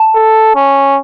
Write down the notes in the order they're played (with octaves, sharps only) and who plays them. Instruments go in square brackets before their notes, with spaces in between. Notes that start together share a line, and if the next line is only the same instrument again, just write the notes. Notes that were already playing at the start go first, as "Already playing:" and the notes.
Already playing: [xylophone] A5
[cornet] A4
C#4